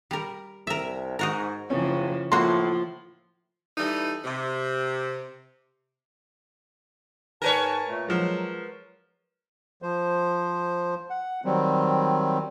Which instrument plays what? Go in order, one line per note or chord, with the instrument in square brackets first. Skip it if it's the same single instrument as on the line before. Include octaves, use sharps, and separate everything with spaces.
[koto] G3 A#4
[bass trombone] C2 [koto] A#4 E5
[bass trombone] G#2 [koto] D#4 F#4 A#4
[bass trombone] F#1 [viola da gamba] C#3 E3 F3 [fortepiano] C#4
[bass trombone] A2 [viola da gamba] F3 F4 [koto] A#3 F#4 [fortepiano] C6
[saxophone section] E3 G3 A3 D#4
C3
[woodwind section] G#2 G#5 A5 [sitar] A#4 B4 C#5
[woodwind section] A#2 A3
[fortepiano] F3 G#3 [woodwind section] F#3
[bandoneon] F3 C5
F#5
D#3 F#3 G3 C4